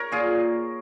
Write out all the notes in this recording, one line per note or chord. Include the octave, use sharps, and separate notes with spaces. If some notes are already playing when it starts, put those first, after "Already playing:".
Already playing: A#4 C#5
A#2 F4 G#4